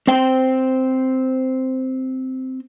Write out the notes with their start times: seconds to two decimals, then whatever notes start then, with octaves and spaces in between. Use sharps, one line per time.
0.07 C4 C5 G5